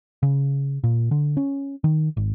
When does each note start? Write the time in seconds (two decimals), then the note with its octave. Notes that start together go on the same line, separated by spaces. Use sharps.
0.23 C#3
0.84 A#2
1.11 D3
1.37 C#4
1.84 D#3
2.17 G#1